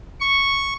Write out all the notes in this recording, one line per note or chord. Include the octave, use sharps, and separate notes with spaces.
C#6